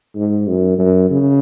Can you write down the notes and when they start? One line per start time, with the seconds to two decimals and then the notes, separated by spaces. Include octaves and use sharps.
0.15 G#2
0.47 F#2
0.79 F#2
1.10 C#3